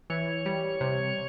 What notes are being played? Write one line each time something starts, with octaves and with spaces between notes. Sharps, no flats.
E3 C#5
G3
C3